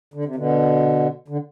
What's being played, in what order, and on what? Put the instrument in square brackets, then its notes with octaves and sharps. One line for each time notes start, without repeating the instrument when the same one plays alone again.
[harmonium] D3
C3
B2 D3
D3